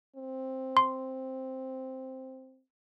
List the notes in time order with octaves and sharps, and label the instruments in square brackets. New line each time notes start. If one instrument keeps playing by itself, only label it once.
[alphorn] C4
[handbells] C6